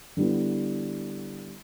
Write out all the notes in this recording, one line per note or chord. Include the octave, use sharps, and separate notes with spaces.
D3 G3 B3 E4